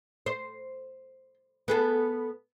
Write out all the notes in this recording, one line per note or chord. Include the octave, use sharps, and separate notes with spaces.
C5
B3 G#4 A4